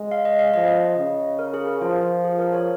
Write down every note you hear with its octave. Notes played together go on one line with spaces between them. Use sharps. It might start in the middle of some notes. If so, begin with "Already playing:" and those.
Already playing: G#3
F5
D#5
F5
F3 D#5
C#3
A#4
G#4
A#4
F3 F4
G#4
A#4
C#5